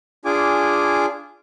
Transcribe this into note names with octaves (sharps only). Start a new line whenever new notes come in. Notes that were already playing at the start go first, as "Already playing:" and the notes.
D4 F4 G#4 G#5 D6